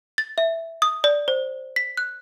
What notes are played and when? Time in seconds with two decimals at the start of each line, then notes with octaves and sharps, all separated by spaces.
0.18 A6
0.38 E5
0.82 D#6
1.04 D5
1.28 C5
1.76 B6
1.97 F#6